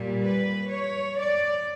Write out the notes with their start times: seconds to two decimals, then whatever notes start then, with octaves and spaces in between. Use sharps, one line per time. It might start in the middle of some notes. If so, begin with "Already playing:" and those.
Already playing: A#2 G3
0.22 B4
0.69 C#5
1.17 D5